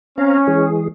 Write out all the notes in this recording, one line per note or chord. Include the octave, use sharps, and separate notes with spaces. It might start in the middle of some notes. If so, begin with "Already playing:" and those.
C4 C#4 F5 A#5
E3 G#3 G#4